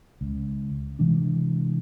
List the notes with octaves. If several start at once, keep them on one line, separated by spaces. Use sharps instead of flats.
C#2
C3 E3 G#3 D4